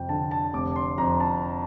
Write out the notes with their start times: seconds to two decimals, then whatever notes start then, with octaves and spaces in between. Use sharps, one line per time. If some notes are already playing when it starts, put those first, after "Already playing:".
Already playing: F2 C3 G5
0.09 D3 A5
0.31 A5
0.53 F1 D6
0.76 C6
0.98 F2 A#5
1.20 A5